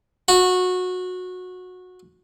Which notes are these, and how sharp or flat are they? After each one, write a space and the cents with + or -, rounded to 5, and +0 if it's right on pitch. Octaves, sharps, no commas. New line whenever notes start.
F#4 -20